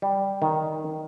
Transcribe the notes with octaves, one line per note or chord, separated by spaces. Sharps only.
G3
D#3